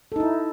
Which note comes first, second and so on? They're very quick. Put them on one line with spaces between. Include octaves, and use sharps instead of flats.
A4 D#4 E4